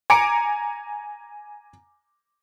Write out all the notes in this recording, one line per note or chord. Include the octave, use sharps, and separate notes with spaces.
G#5 A#5 D6 C#7 D7